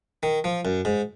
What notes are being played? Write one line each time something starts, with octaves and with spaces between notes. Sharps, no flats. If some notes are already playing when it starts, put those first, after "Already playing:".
D#3
F3
F#2
G#2